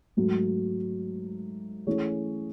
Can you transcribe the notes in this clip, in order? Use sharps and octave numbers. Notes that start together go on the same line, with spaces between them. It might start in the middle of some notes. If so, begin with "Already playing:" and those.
G#2 F#3 A3
E3 A3 C#4 G#4 C#5